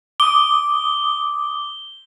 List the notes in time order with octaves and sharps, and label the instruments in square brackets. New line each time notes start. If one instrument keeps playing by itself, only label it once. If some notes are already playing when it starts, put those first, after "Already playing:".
[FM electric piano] D6 D#6 [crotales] G7